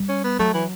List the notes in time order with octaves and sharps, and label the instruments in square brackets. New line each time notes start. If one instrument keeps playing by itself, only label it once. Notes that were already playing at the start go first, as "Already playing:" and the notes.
Already playing: [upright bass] G3
[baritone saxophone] C#4
B3
[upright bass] F#3 [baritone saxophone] A3
[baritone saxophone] E3